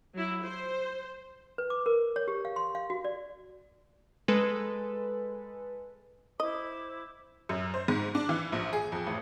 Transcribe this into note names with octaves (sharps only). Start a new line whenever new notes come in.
F#3 E4
C5
B4
D6
A#4
C#5
G4
F5
C6
F5
F#4
D5
G#3 A4 B4
E4 C5 D#5 D6
F#2
C5
G#2
D4
E3
A#1
G#4
F2
A1